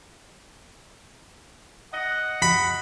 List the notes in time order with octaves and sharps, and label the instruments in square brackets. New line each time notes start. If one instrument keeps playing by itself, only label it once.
[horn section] D#5 F#5
[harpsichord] B5